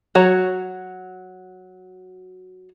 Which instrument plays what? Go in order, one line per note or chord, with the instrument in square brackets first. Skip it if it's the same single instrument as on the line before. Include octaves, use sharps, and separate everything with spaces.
[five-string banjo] F#3 F#4 C#5